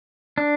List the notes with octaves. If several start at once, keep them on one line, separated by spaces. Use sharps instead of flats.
D4